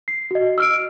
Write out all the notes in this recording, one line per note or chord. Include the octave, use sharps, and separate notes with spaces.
C7
F#4 D#5
E6 F6 D7